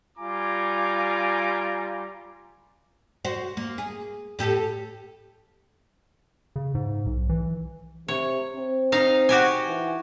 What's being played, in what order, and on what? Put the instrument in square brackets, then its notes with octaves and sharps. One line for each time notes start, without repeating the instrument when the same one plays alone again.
[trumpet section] G3 F4 G#5 A#5 D6
[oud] F#4 C5
A#3
G#4
A2 G4 A4
[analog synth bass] C#3
G#2
B1
E3
[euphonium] C3 [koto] C#5
[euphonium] C4
[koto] D#4 F5
F#4 G4 G#5
[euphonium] E3